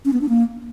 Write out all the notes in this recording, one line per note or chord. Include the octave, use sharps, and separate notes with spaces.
C#4
B3
D4
A#3